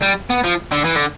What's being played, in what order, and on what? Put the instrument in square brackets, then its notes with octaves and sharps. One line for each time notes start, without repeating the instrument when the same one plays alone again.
[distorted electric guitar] G3
B3
F3
D3
E3
D3